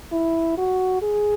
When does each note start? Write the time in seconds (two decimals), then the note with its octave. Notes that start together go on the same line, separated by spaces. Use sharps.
0.12 E4
0.57 F#4
1.02 G#4